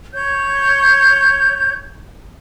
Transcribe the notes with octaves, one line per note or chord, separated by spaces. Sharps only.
C#5 G6